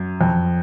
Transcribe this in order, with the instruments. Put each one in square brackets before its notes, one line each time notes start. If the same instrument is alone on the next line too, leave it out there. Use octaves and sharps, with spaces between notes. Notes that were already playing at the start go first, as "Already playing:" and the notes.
Already playing: [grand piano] F#2
F2